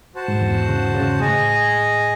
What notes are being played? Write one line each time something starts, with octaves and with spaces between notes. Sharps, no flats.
F#4 C5 F#5 A5
G#2
E2
C#3
C#3
A2 G#4 D#5 G#5